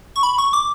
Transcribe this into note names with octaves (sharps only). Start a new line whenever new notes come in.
C#6
B5
C#6
D6